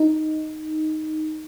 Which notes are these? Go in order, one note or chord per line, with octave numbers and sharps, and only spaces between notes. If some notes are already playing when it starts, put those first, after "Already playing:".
Already playing: D#4